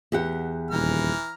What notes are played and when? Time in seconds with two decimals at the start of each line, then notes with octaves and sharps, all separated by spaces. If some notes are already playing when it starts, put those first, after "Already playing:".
0.12 E2 G4 F#5
0.71 D#1 E3 A#5 F6